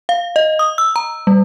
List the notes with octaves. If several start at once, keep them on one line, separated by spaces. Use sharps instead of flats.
F5
D#5
D#6
E6
A#5
G3